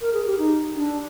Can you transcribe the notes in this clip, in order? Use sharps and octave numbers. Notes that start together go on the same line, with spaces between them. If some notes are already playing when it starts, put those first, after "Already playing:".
A#4
G#4
G4
D#4
D4